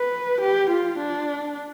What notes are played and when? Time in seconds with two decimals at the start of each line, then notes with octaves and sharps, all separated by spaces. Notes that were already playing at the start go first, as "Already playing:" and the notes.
Already playing: B4
0.41 G4
0.70 F4
0.99 D4